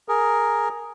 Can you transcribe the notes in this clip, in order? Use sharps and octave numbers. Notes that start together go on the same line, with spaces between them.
G#4 A#4